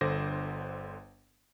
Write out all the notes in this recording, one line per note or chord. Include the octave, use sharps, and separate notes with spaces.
G1 D3 A4 C5 D6 A#6